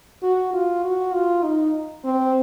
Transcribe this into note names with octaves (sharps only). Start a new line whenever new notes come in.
F#4
F4
F#4
F4
D#4
C4